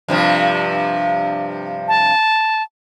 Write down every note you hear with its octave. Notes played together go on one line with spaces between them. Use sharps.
G2 C3 F3
A5